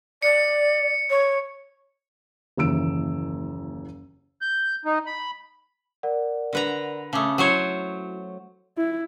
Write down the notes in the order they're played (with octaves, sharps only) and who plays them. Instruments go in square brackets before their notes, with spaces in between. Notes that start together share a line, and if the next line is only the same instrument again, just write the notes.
[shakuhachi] D5 [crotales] C#7
[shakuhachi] C#5
[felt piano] F#1 D#2 E3 E6 D7
[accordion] G6
D#4
B5
[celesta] A#4 D5 F#5
[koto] D3 B4 A#5
[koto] C#3 A3 [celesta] A5 D6 D#6
[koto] F#3 C5 C#5 [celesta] E4 F#4
[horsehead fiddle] E4